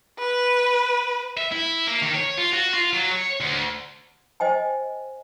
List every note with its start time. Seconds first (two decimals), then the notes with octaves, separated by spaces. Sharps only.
0.19 B4
1.37 E5
1.52 E4
1.87 A#3
2.02 D#3
2.14 C#5
2.37 F4
2.53 F#4
2.74 F4
2.93 F#3
3.11 C#5
3.40 D2
4.40 C5 D#5 G5 G#5